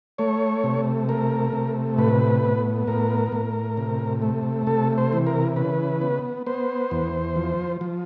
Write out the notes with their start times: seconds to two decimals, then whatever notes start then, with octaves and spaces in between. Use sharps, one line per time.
0.18 A3 C#5
0.64 C3
1.09 A3 A#4
1.53 C3
1.98 A2 B4
2.43 B3
2.87 A2 A#4
3.32 A2
3.77 C3
4.22 A3
4.67 C3 A4
4.98 C5
5.13 E3
5.27 A#4
5.56 C#3 B4
6.01 B3
6.47 B3 C5
6.91 E2
7.36 F3
7.81 F3